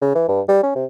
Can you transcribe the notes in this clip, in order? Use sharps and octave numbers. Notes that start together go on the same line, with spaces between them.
C#3
E3
G2
G3
C#4
C3